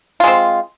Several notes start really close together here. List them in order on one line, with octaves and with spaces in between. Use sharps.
F4 G#3 C4